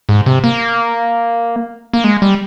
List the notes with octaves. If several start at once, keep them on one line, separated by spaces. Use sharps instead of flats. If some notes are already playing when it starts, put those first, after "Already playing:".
G#2
C3
A#3
A#3
G#3
G3